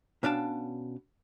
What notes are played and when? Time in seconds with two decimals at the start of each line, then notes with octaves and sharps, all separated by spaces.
0.23 B2 C#4 D4 F5 G5 A5